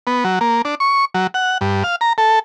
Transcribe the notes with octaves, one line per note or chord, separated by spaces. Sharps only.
B3
F#3
A#3
D4
C#6
F#3
F#5
G2
F5
A#5
A4